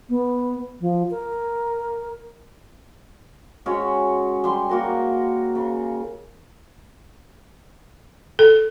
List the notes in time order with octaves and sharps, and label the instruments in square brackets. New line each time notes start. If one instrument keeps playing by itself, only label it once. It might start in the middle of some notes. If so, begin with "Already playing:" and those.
[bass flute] B3
F3
A#4
[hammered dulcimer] G#3 C#4 F#4 C#5
G3 C6
A#3 F#4 A#4
C#3
[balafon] A4